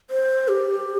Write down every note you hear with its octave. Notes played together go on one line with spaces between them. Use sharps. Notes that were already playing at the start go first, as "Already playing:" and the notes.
C5
G4